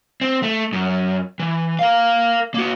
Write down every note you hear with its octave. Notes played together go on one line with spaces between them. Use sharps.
C4
A3
F#2
E3
A#4 F5
A#3 F#4